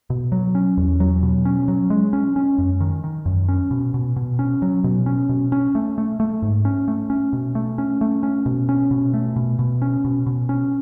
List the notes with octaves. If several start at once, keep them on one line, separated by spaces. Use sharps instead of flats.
B2
F#3
C#4
E2
F#3
B2
C#4
F#3
G#3
C#4
C#4
F#2
D#3
D#3
F#2
C#4
B2
B2
B2
C#4
F#3
B2
C#4
B2
C#4
A3
A3
A3
G#2
C#4
A3
C#4
B2
A3
C#4
A3
C#4
B2
C#4
B2
A3
B2
B2
C#4
B2
B2
C#4